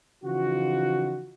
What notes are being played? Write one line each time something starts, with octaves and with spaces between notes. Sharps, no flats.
C#3 E3 F3 D#4 F4 F#4